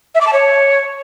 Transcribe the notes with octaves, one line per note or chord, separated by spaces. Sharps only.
E5
D6
A5
C#5